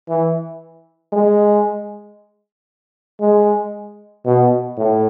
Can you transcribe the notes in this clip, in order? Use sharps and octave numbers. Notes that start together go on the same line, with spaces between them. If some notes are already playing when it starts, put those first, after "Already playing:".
E3
G#3
G#3
B2
A2